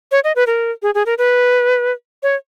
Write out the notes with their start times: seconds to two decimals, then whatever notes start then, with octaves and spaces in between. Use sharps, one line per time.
0.12 C#5
0.24 D#5
0.36 B4
0.47 A#4
0.82 G#4
0.95 G#4
1.06 A#4
1.18 B4
2.23 C#5